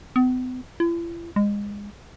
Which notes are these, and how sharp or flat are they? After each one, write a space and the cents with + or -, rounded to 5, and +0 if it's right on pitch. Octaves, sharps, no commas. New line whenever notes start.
B3 +45
E4 +45
G#3 -25